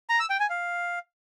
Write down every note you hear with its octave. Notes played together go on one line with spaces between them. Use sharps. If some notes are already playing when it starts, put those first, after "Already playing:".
A#5
E6
G5
G#5
F5